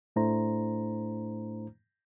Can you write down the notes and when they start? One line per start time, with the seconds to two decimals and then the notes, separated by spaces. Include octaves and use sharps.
0.16 A2 A3 D4 E4 C5 A#5